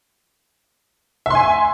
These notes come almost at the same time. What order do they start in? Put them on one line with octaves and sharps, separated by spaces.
E5 C6 G#5